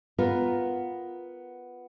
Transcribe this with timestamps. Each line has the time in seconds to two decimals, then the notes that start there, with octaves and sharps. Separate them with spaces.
0.18 B3 F4 A#4 B4